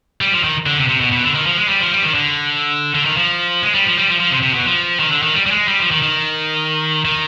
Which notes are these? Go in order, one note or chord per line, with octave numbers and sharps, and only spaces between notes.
G3
F3
D#3
D3
C3
C3
B2
B2
D3
D#3
F3
G#3
G3
F3
G3
D#3
D3
D3
D#3
F3
G#3
G3
F3
G3
F3
F3
C3
C3
B2
F3
D#3
D3
D#3
G3
G3
G#3
G3
F3
D#3
D#3
D#3